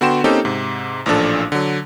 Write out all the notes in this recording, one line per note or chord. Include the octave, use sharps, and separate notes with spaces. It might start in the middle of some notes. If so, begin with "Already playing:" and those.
D3 B3 F#4 G5 C6 E7
A#3 C4 C#4 D#4 G4 A4
G#2 C3
A1 A#2 F3 D4 A4
D3 F#3